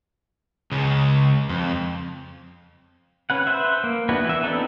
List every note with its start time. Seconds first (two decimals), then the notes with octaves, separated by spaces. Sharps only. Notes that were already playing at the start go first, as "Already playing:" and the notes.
0.72 C#2 C#3
1.49 F2
3.30 C#4 B4 F#5
3.47 B4 C5 E5
3.84 A#3
4.09 B3 D4 E4 F#4 B4
4.25 E3 E5
4.43 B3 C4 D4 D#4 A4